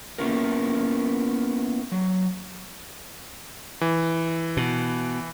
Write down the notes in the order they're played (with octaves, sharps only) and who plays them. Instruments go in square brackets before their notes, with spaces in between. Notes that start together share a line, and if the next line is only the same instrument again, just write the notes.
[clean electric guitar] A#3 B3 C#4 E4 F4 A#4
F#3
[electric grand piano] E3
[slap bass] B2